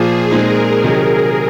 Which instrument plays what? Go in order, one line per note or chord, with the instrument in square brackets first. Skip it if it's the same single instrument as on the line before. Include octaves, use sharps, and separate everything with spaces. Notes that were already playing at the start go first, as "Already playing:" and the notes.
Already playing: [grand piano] A#2 F3 A#3 [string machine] G#4
[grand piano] A#2 G#3 C4 D#4 [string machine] A#4
[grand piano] C3 D#3 F#3